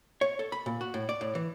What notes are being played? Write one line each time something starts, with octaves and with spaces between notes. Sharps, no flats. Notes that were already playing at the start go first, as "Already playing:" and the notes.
C#5
A4
B5
A#2
F#4
A2
D5
A2
E3